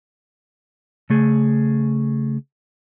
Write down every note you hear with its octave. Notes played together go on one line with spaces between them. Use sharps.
C#3 A3 G#4